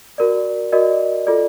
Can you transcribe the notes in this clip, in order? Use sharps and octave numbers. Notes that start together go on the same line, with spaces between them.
F#4 A#4 D5
F#4 A#4 D5 D#5
F4 A4 D5